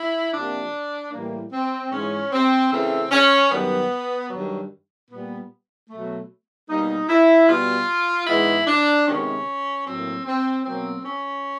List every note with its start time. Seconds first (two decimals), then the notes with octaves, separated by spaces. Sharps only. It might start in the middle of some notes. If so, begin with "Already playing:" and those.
Already playing: E4
0.34 C3 F3 A#3 D4
1.12 A2 E3 G3 A#3
1.53 C4
1.92 G#2 E3 G#3 C#4
2.32 C4
2.71 C#3 E3 A3 C4
3.11 C#4
3.51 F#2 D#3 G3 B3
4.30 G2 D#3 F#3
5.10 A#2 G3 B3
5.89 B2 F#3 A3
6.68 B2 G3 A#3 D#4
7.09 E4
7.48 B2 G3 B3 F4
8.27 G#2 E3 G#3 B3 E4
8.67 D4
9.06 C3 D#3 G#3 B3 C#4
9.86 A2 F#3 A#3 C4
10.26 C4
10.65 B2 F#3 A#3 C4
11.05 C#4